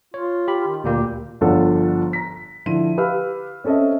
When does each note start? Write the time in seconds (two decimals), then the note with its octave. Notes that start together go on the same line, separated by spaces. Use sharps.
0.14 F4 C#5
0.48 G4 B5
0.67 D#3
0.84 D2 A#2 A#3 G4
1.41 G1 F3 D4 F4 A4 F#5
2.13 A#5 A#6 B6
2.66 D3 F3 E4 C6 D#7
2.97 G4 B4 F5 B5 E6 F6
3.64 C4 C#4 A4 D#5 E5